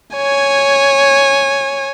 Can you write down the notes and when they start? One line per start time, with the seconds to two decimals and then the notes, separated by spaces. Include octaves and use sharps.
0.16 C#5 G#5